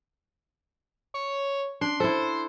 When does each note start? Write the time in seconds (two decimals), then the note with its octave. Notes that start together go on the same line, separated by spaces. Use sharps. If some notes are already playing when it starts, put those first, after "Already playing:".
1.14 C#5
1.81 D4 C6
2.00 E4 A4 C5